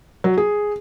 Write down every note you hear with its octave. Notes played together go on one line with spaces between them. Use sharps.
F#3
G#4